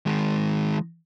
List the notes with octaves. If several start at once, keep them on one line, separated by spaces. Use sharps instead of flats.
D#3 G#3